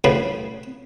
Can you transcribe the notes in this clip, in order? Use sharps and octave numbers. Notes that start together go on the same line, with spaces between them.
A2 C#3 G3 B4 F5